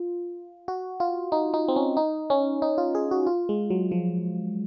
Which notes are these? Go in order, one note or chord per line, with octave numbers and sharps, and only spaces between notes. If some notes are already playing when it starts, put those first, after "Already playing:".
Already playing: F4
F#4
F4
D#4
D#4
C4
C#4
D#4
C#4
D#4
F4
G#4
F#4
F4
G#3
F#3
F3